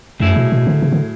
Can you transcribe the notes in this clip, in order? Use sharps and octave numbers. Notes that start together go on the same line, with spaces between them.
F#2 A2 F#3 A3 E4 G#4
B2
B2
D3
C#3
D3